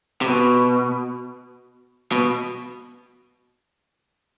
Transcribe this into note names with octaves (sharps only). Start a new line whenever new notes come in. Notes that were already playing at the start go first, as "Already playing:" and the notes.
C3
B2
B2